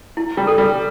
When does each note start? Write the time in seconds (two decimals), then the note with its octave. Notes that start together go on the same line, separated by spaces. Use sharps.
0.17 E4
0.37 G3
0.47 A4
0.58 G3